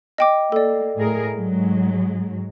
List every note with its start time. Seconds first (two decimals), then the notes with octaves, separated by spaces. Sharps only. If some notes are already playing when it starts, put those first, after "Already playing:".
0.18 D#5 G5 D6
0.52 A#3 A4 D5
0.97 A2 G#4 A#4
1.33 G#2 F#3 G#3